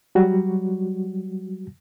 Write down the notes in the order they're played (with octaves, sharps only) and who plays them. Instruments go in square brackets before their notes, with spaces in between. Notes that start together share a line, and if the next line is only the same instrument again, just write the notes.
[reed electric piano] F#3 G3 F#4